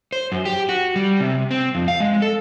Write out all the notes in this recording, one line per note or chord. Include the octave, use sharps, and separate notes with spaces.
C5
F#2
G4
F#4
G3
C3
C4
F2
F5
G#3
A4